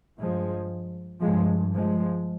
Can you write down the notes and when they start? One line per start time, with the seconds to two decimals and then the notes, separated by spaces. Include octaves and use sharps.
0.19 G2 F3 G#3
1.21 G2 F3 G#3
1.73 F3 G#3